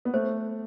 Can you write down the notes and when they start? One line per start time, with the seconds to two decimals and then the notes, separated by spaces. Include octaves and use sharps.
0.05 B3
0.14 A3 C5